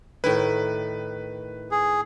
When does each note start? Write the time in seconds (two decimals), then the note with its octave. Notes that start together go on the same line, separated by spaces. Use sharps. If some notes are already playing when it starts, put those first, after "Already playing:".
0.24 A2 D#3 E4 B4
1.71 G#4